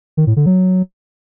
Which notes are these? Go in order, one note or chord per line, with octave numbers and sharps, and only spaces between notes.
D#3
A2
D3
F#3